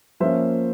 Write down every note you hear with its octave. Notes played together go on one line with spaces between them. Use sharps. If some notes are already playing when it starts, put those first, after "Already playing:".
F3 A#3 C#4 C5 E5